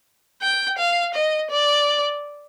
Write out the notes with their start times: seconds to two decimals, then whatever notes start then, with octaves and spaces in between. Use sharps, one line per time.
0.42 G5
0.78 F5
1.14 D#5
1.51 D5